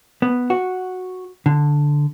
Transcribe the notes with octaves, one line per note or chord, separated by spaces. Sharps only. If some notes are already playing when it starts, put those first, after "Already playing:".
B3
F#4
D3